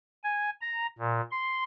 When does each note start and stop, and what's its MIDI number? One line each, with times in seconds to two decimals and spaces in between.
0.24 0.50 80
0.61 0.87 82
0.99 1.21 46
1.31 1.63 84